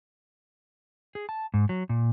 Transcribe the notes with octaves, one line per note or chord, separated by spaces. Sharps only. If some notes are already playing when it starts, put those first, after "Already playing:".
G#4
A5
G#2
F#3
A#2